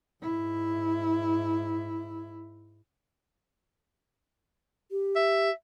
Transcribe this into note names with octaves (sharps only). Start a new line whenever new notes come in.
G#2 E4
G4
E5